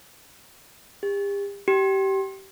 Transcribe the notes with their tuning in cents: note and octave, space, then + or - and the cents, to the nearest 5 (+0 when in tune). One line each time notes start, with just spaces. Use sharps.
G4 +40
G4 -25